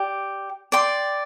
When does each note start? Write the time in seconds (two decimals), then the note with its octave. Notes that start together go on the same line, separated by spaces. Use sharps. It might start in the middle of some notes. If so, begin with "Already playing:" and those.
Already playing: G4 D5
0.72 D5 G5 C6